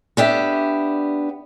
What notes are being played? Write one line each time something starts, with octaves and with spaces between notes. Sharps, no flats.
B3 D4 G4 E5